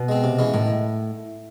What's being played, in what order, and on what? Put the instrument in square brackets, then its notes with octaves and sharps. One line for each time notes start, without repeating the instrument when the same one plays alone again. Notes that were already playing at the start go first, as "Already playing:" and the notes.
Already playing: [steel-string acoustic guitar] B2
[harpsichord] G#3 C4
C3
E3 G#3 C#4
[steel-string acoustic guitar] A2 [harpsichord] D#3